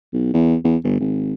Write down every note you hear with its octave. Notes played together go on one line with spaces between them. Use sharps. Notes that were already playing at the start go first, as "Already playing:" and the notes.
B1
E2
E2
G1
G#1